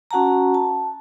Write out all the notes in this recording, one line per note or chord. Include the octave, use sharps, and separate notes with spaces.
C#4 F#4 F#5 A5 A#5
A5